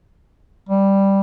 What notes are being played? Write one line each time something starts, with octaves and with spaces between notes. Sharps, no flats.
G3